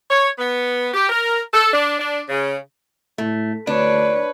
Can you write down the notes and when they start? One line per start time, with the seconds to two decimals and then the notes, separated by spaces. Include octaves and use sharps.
0.10 C#5
0.38 B3
0.94 G4
1.10 A#4
1.53 A4
1.73 D4
2.00 D4
2.29 C#3
3.18 A2 A3
3.67 D2 D4 B4 C#5